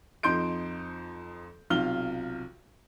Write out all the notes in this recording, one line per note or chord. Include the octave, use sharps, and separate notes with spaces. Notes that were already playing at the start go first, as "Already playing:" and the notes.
F2 F3 D#4 C6 G6 D7
B1 C3 F4 F6 G7